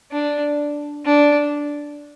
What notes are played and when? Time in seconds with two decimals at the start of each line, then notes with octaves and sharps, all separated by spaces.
0.12 D4
1.06 D4